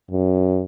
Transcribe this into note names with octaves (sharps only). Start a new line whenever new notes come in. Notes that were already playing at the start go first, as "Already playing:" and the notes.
F#2